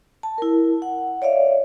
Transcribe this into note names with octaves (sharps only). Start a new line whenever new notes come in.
A5
E4 A#4
F#5
C#5 D5 E5 F5